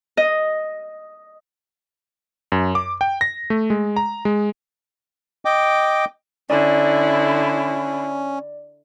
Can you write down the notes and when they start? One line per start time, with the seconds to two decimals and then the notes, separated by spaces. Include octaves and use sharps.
0.17 D#5
2.52 F#2
2.75 D6
3.01 G5
3.21 A#6
3.50 A3
3.70 G#3
3.96 A#5
4.25 G#3
5.45 D#5 G5 D6
6.50 D3 C#4 E4 D5